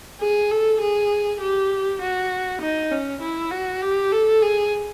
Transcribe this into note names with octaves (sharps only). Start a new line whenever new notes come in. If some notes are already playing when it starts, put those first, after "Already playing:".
G#4
A4
G#4
G4
F#4
D#4
C#4
E4
F#4
G4
A4
G#4